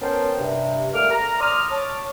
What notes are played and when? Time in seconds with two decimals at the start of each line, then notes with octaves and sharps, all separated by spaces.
0.01 B3 C#4 A#4 C5 G5 A5
0.38 G2 C3
0.93 G3 A3 A#3 D6 F6
1.10 A#5
1.40 D5 C6 D6 D#6 F6
1.70 C#5 A5 D6